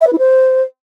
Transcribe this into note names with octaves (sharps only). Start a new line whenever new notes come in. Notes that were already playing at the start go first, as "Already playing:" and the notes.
E5
B4
E4
C5